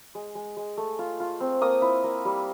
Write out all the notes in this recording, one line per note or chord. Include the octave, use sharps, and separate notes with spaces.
G#3
G#3
G#3
A3
F4
F4
C4
A#3 D#6
E4
A#3
G3